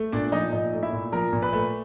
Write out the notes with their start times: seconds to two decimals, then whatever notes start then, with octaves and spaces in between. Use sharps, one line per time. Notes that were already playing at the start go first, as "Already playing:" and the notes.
Already playing: A3
0.12 A#2 D4 D5
0.32 F3 D#4 D#5
0.52 A#2 D#4 D#5
0.73 A3
0.83 E4 E5
0.92 A#2
1.12 F3 A#4 A#5
1.33 A#2
1.42 B4 B5
1.53 A3